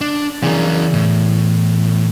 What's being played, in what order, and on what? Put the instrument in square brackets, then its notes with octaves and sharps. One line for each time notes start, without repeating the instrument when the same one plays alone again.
[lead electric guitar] D4
[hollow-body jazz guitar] E2 [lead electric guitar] C#3 A#4
[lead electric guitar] A2